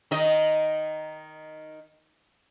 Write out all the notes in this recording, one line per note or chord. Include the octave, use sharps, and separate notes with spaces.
D#3 D#5